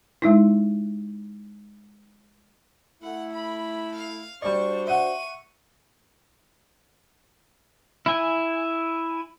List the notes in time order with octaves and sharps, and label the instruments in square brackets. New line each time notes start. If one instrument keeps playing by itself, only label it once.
[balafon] G#3 D#4 E4
[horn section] A3 E4 [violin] F#5
[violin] B5
F5
[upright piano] G3 D5 [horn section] D4 F#4 C5 [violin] C#6
[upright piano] E5 F#5 [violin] C#6 D#7
[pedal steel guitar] E4 G#5